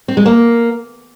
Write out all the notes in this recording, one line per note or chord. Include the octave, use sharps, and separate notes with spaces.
C4
G#3
A#3